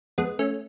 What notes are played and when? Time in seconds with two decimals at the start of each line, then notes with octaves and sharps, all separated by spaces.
0.18 F2 G#3 B3
0.39 A3 C#4